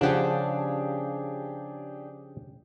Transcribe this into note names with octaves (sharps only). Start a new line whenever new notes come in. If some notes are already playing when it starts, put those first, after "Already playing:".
C#3 F3 D4 G4 G#4 F#5